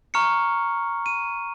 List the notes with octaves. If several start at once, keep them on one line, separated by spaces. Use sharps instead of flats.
A#5 C#6 F6 C#7
D#7